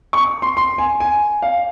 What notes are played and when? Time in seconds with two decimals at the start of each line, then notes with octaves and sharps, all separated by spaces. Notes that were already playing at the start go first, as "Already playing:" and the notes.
0.13 C#6
0.42 C6
0.57 C6
0.78 G#5
1.00 G#5
1.42 F5